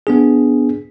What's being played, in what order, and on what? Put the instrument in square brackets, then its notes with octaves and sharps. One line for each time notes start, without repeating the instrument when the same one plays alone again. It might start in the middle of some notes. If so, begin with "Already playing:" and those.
[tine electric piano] B3 D4 G#4